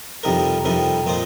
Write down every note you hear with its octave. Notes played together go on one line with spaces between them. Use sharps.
F2 C3 G3 D#4 A#4
F2 C3 G3 D#4 A#4
A#2 A#3 F4 C5 D#5